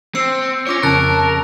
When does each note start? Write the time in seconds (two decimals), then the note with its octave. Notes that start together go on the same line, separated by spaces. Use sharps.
0.15 C4 E6 C7 C#7
0.67 C#4 F4 C#5 C#6 D6 A#6
0.83 F2 C#3 A#4 A5 F#6 A6